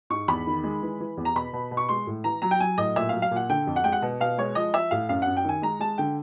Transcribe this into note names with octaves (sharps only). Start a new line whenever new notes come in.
G#2 C#6
E2 B5
D#3
G#3
E3
E3
E2
A#5
B2 B5
B2
B2
C#6
G#3 C6
A2
E3 A#5
F#3 A#5
G5
F#3 G#5
A2 D#5
A#2 E5
F#3 F5
F5
A#2 F#5
D3 G5
F2
F#5
G#3 G5
F#5
B2
B2 F5
G#3 C#5
F3 D#5
F3 E5
A2 F5
F#2 F5
F#2 F#5
G5
D#3 G#5
G#3 A#5
G#3 A5
D3 G5